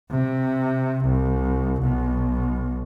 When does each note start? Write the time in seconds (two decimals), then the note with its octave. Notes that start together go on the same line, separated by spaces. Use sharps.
0.10 C3
1.05 C2
1.82 B1